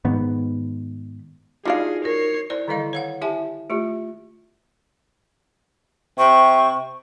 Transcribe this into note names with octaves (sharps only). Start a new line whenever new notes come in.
G#2 D#3 B3
G3 D4 D#4 F4 F#4 G#4 F5
A#4 C#5 C7
E4 A#4 C5 D5
D3 D#3 G3 E4 D#5 F5
C#5 F5 F#5
E4 G4 E5 G#5 A5
A3 F4 G4
C3 C#6